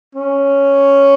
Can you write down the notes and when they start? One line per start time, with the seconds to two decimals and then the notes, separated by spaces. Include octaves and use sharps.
0.15 C#4